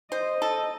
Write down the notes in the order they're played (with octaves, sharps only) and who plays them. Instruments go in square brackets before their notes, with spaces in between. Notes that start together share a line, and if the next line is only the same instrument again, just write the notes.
[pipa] C5 [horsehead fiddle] D#5
[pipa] A4